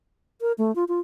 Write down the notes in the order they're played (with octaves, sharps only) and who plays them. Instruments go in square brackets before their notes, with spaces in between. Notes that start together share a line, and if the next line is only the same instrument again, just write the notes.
[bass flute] A#4
A3
F4
F4